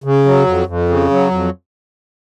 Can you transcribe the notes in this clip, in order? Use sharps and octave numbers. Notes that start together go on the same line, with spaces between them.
C#3
F#3
F2
F2
C#3
F#3
F2